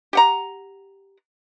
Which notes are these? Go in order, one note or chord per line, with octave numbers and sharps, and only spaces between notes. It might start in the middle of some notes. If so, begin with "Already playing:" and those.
G4 F#5 A#5